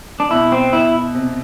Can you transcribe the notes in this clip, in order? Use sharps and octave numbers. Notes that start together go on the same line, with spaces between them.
D4
B2 E4
C4
B2 E4
C3